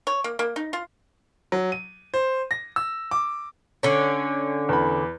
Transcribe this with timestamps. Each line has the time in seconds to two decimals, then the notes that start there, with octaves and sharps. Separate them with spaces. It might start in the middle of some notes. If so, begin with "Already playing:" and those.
0.07 C#5
0.24 A#3
0.39 A#3
0.56 D#4
0.73 F4
1.52 F#3
1.72 D#7
2.14 C5
2.51 A#6
2.76 E6
3.11 D6
3.83 D3 C#4
4.69 E2 B5